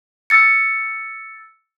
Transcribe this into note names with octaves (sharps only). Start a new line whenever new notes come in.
E6 A6 C#7